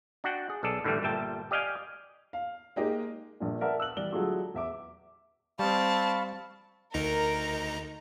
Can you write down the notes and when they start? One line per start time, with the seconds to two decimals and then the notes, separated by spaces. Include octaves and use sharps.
0.24 D4 F#4 F#5 G5
0.50 G#4
0.63 B1 G#4 A4 D5 A5
0.84 A2 D3 E3 G3 A3
1.02 G1 A#2 G3 E5 G5 A5
1.51 G4 D5 D#5 F5 G5 G#5
2.33 F5
2.76 G#3 A#3 D#4 G4
3.40 A#1 G2 A#2
3.61 A#4 B4 D5 E5 F#5 A5
3.80 E6 F#6 F#7
3.97 E3 G3 D5 G7
4.12 D3 F#3 G#3 A3 F4 G4
4.54 E2 E5 D6
5.59 G3 C4 F5 A5 B5 C#6
6.94 D2 D#4 A#4 A#5